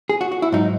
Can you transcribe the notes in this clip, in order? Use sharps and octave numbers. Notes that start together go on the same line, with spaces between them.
G#4
F#4
F#4
E4
G#2 F#3 D#4